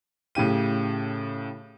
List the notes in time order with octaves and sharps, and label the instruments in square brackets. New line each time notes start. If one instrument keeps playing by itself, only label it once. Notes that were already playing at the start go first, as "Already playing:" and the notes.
[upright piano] A2 C#3 G4 D#7